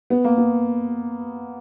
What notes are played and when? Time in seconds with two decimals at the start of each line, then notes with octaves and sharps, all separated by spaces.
0.10 B3
0.24 A#3
0.38 B3